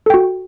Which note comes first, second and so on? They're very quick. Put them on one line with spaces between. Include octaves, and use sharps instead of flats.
A4 G5 F#4